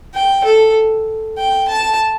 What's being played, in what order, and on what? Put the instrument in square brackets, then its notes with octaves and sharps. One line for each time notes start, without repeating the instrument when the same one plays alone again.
[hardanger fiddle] G5
A4
G5
A5